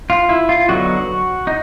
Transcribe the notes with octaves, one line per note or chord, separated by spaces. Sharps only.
F4
E4
F4
D3 F#3 B3 D#4 F#4
D#4